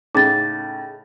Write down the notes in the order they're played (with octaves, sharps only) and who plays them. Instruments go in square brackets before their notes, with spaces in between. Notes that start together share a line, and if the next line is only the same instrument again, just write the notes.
[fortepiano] A2 C#3 [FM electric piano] D#4 G#4 [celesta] D6 A6